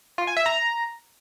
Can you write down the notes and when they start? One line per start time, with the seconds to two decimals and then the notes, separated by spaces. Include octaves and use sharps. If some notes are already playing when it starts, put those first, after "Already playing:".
0.18 F4
0.27 G#5
0.37 E5
0.46 A#5